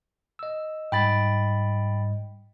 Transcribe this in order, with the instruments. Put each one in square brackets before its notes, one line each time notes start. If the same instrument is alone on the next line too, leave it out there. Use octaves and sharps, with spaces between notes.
[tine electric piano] D#5 E6
[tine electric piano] G#2 G3 D#5 [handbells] G5 B5 A6